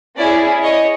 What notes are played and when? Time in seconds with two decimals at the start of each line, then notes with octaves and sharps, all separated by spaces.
0.17 C#4 E4 G#4 D5
0.62 C#5 D#5